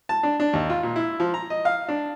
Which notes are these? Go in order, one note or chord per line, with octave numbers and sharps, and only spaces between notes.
A5
D4
D4
D#2
F4
A#2
E4
F3
A#5
D#5
F5
D4